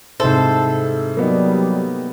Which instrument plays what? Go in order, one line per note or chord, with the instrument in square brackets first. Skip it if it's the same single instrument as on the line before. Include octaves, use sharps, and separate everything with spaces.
[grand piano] G#2 E4 [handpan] C3 C5 [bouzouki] A4
[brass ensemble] F#3 G3 [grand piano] A#3 B3 D#4